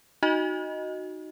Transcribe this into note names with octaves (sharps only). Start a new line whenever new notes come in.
D#4 F#4 D#5